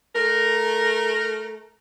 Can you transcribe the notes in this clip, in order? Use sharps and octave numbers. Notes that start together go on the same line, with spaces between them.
A3 A#4